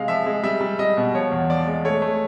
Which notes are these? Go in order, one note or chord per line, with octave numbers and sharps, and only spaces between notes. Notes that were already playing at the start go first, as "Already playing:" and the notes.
Already playing: C3 G#3 F5
F3 E5
G#3
G3 E5
G3
G3 D#5
B2
F3 C#5
E2
F3 D5
G#3
A3 C#5
A3